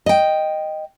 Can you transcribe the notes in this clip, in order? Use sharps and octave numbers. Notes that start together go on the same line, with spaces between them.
D#5 G5